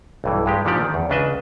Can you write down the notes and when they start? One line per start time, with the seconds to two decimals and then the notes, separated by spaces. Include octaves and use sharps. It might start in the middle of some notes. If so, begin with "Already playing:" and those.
0.24 B1 G2 E3
0.46 G2 G#3 G4
0.65 A#2 D3 D#3 F3 G4 D5
0.80 D#3
0.94 E2
1.10 C#2 C#3 D4 B4 D#5 E5